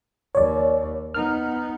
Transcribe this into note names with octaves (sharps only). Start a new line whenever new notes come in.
D#2 C#5 D5
B3 D#4 F6